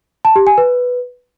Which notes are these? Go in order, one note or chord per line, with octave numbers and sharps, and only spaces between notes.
A5
G4
G#5
B4